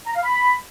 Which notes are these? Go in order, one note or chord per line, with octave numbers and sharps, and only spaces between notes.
A#5
F5
B5